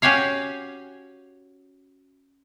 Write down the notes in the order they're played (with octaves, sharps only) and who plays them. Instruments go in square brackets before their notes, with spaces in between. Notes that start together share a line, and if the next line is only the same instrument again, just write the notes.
[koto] C#4 F#4 G4 C#5 F5